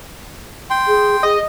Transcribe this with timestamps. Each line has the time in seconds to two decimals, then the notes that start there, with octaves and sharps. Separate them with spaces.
0.70 G5 C6
0.87 G#4
1.23 G#4 D#5